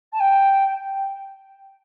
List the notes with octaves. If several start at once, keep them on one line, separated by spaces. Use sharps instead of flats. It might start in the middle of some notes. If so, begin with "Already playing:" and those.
A5
G5